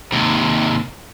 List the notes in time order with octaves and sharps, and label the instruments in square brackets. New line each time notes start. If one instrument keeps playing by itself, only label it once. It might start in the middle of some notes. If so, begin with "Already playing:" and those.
[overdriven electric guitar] D#2 C3